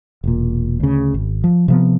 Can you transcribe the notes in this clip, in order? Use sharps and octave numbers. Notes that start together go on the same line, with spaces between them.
E1 A#2
D2 C#3
G#1
F3
C3 F3 B3